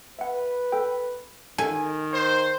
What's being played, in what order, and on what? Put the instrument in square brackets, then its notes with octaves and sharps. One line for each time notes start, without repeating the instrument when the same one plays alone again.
[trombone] B4 [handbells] E5 F#5
[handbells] A4 G5
[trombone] D#3 [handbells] A4 A5 [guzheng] G#5
[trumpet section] C5